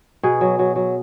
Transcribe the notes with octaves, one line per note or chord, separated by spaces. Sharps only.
B2 G#4
F#3
F#3
F#3